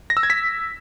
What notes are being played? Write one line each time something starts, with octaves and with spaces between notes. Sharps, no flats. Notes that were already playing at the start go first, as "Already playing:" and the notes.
A#6
E6
G#6
B6